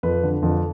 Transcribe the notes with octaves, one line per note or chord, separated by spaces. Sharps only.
F2 B4
D3
F2